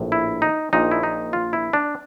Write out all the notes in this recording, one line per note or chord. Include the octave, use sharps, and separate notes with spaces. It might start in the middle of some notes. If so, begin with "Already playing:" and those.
Already playing: A#1 A2
E4
D#4
A#1 A#2 D#4
E4
D#4
F4
E4
D4